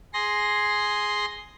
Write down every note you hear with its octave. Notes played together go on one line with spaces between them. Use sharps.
G#4 C6 A#6